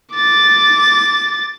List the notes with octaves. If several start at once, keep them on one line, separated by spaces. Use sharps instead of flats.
D6 A6